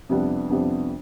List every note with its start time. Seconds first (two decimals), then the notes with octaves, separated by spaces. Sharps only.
0.09 F2 C3 G3 B3 D4
0.50 F2 C3 G3 B3 D4